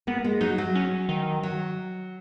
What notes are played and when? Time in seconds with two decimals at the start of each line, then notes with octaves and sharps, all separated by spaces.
0.07 A#3 B3
0.24 G#3
0.41 F#3 D#4
0.58 F#3
0.75 C#4
1.09 D#3
1.43 F#3